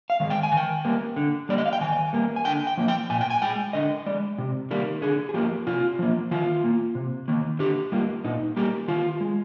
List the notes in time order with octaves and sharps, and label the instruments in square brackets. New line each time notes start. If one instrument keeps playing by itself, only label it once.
[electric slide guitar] F5
D#3 G#3
G5
G#5
D#3
G5
G3 A#3
D3
G3 A#3 D5
D#5
F5
G5
D#3 G#5
G3 A#3
G#5
D3 G5
G5
F3 A#3
G5
A#2 G#5
G5
G#5
G#3 G5
D3 D#5
G#3 D5
C3
D#3 G3 A#3
D3 G#4
G#4
F3 A#3 G4
C3 F4
F3 A#3
D#3 F4
A#3
C3
D#3 A#3
D3 G4
G3 A#3 F4
A#2 D#4
G3 A#3 G4
D#3 F4
G#3